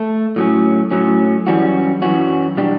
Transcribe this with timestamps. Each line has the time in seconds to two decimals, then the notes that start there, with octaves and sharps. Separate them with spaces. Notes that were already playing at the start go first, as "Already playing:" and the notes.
Already playing: A3
0.36 A2 F#3 C#4
0.91 A2 F#3 C#4
1.47 F#2 E3 G3 C#4 F#4
2.02 F#2 E3 C#4 F#4
2.57 B2 G3 D4 G4